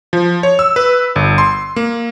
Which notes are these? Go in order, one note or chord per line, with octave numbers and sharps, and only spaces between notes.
F3
C#5
E6
B4
G1
C6
A#3